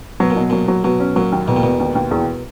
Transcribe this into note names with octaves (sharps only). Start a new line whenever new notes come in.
B2 F#3
A#2
B2
A#2 F#3
F#3
B2 F#3
C#4
A#2 F#3
D#2
E1 B2
A#2
E1 B2
D#2
D#2
E2